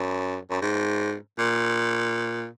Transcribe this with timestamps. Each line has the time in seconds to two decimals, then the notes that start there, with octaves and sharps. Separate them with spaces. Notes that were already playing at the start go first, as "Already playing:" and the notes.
Already playing: F#2
0.50 F#2
0.61 G#2
1.39 A#2